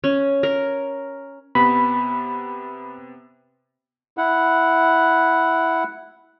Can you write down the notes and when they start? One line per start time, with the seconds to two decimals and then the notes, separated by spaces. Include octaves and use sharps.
0.04 C#4
0.43 A#4
1.55 C3 B3 B5
4.18 E4 F#5